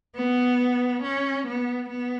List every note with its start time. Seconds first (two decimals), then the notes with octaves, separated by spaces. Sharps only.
0.15 B3
1.02 C#4
1.46 B3
1.90 B3